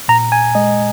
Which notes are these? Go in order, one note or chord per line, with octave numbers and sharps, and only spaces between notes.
A#2 A#5
G#5
G#3 D#5